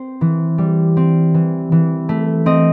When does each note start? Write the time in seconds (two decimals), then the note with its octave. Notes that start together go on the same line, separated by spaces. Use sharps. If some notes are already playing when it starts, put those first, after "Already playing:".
Already playing: C4 C5
0.21 E3
0.58 G3
0.97 C4
1.34 E3
1.72 E3
2.09 A3
2.46 C4 D#5